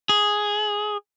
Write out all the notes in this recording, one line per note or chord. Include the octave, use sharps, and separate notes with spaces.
G#4